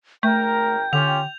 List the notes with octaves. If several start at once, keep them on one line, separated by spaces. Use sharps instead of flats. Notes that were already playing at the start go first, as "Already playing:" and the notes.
G#1 A3 A#4 G5 G6
D3 C#4 F4 G4 F7